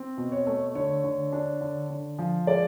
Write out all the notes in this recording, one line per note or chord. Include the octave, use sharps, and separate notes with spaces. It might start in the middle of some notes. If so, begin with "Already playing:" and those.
Already playing: C4
B2
C#5
A3
D3 C#5
D3
D4
D3
D3
F3
G#3 D5